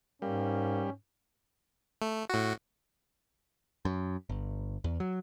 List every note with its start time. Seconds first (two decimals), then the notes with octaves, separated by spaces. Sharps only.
0.22 G#2 G3 A#3 C#4
2.02 A3
2.30 A2 F#4
3.85 F#2
4.29 G1
4.84 E2
5.00 F#3